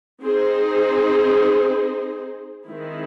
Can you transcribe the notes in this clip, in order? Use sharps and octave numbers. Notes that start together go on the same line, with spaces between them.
C4 D#4 G#4 C5
D#3 G#3 C4 E4